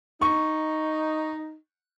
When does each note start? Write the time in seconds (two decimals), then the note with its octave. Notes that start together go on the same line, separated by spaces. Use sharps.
0.21 D#4 C#6